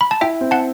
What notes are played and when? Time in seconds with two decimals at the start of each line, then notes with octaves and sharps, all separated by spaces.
0.01 B5
0.11 A5
0.21 E4 E5 G5
0.41 C4
0.51 F#5 A5